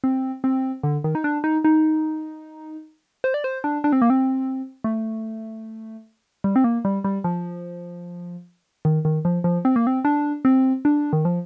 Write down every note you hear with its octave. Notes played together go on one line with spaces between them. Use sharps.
C4
C4
D3
D#3
D#4
D4
D#4
D#4
C5
D5
C5
D4
D4
C4
A#3
C4
A3
G3
C4
A#3
G3
G3
F3
D#3
D#3
F3
F3
C4
A#3
C4
D4
C4
D4
D#3
F3